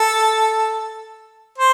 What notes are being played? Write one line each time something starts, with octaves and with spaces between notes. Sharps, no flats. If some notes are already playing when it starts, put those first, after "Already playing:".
Already playing: A4
C5